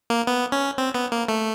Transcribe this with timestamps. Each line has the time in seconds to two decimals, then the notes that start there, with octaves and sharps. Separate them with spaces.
0.10 A#3
0.27 B3
0.52 C#4
0.78 C4
0.94 B3
1.12 A#3
1.28 A3